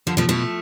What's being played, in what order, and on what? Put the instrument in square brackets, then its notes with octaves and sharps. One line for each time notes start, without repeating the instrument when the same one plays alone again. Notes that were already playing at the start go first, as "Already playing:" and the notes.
[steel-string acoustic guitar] D3 [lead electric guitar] F3
[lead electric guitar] B2 [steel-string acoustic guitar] F3 A3
[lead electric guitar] B2 [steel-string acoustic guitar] F3 A3